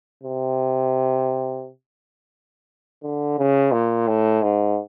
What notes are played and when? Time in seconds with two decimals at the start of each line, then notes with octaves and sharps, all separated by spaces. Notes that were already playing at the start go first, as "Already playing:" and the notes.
0.23 C3
3.03 D3
3.38 C#3
3.72 A#2
4.08 A2
4.43 G#2